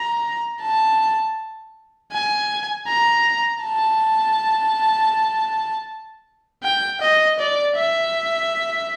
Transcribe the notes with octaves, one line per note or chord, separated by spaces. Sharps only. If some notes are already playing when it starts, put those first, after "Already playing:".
Already playing: A#5
A5
G#5
A#5
A5
G5
D#5
D5
E5